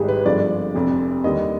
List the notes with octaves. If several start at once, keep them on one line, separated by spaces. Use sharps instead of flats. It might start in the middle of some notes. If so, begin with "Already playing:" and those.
Already playing: G#1 G#2 G3 G4 G#4
B4
G1 G2 D3 F3 G#3 D5
F1 F2 C3
D#2 D3 G3 D#5